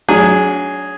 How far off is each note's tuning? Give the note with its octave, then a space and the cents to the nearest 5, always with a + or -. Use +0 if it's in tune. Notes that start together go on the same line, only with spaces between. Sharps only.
F#3 +0 D4 -30 G#4 +0